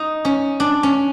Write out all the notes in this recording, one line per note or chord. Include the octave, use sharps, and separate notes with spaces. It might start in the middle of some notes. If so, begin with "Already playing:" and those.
Already playing: D#4
C#4
D4
C#4